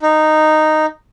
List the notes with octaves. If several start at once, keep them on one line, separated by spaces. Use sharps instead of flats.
D#4